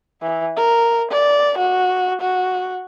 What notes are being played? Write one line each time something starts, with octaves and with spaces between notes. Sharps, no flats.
E3
A#4
D5
F#4
F#4